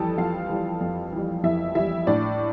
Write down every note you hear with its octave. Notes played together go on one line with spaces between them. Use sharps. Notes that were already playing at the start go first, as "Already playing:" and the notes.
Already playing: F2 E3 G3 A4 A5
F2 F4 F5
E3 G3
F2
E3 G3
F2 E4 E5
E3 G3 E4 E5
A2 D4 D5